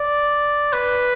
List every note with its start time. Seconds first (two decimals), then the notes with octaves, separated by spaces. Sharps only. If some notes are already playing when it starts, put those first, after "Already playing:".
Already playing: D5
0.73 B4